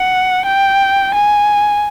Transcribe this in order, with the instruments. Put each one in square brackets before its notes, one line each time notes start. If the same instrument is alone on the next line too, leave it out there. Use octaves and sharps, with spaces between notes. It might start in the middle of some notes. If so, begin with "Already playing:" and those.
Already playing: [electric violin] F#5
G5
G#5